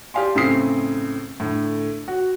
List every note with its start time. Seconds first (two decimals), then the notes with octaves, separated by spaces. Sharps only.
0.14 G4 D5 F5 G#5 C6
0.35 A2 C#3 C4 D#6 C7
1.40 A2 D3
2.08 F#4